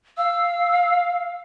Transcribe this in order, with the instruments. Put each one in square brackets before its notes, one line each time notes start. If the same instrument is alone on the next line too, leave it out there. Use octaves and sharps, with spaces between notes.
[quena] F5 [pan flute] E6